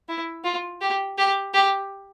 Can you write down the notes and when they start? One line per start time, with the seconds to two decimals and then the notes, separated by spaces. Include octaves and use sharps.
0.08 E4
0.44 F4
0.81 G4
1.18 G4
1.54 G4